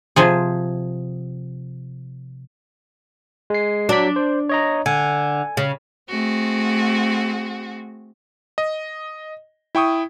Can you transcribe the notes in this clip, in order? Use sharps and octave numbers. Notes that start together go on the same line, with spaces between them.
C3 F3 G#4
G#3 C7
F#3 D4 B6
C5
C#5 D#5 A#5
D3 G#5
C#3
A3 C4 F#4 G#4
D#5
E4 G5 C#6 D#6